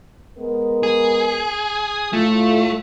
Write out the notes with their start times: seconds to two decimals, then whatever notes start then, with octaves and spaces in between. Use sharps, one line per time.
0.38 G#3 B3 A#4
0.83 G#4
2.13 A2 A3 F4